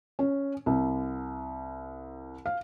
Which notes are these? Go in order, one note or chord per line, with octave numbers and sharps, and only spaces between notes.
C#4
C2
F5